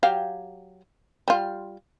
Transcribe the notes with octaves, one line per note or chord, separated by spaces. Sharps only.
F#3 G4 F5
G3 F4